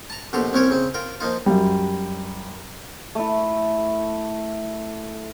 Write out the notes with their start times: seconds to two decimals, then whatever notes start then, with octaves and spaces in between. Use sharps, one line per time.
0.10 A5 A#5
0.33 A#1 B2 G4 A4 A#5 C6
0.53 C2 C4 C#4 A#4 C#5
0.71 C#3 C4
0.94 F4 A#4 G5
1.20 F3 A#3 D#4 F4
1.46 F#2 G3
3.15 A3 E4